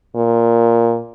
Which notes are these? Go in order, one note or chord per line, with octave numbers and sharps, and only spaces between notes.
A#2